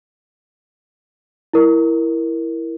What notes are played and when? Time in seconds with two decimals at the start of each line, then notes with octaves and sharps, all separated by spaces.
1.53 E4 A#4